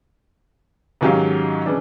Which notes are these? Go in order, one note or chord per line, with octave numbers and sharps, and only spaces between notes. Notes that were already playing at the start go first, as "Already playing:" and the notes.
G#2 D#3 F#3 C#4 G4 F5
C#3 E3 D4